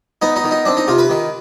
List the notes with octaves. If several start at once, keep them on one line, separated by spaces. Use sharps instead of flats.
B3 D#4
D#4
D#3
D#4
C4 D4
D#4
C3 F4
B4
D#3